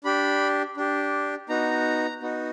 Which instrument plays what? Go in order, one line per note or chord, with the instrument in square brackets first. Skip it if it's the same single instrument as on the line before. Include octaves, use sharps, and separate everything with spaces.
[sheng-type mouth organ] D4 G4 B5
D4 G4
B3 D#4 F#4 A#5
B3 D#4 F#4